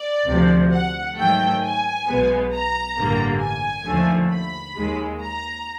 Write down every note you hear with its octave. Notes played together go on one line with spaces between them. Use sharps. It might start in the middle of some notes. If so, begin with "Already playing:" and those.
Already playing: D5
D2 C3 F3
F#5
G#2 D#3 F#3 A3 G5
G#5
B1 B2 G#3 B3
A#5
A1 G2 D3 G3 A#3
G#5
D#2 D3 F3 A3
B5
D#2 D#3 G#3
A#5